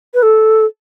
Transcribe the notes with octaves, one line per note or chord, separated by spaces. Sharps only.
B4
A4